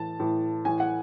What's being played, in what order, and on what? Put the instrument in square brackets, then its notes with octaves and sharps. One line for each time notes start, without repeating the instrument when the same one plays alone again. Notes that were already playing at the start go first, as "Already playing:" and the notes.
Already playing: [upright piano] A2 E3 A5
A2 E3
A2 E3 G#5
F#5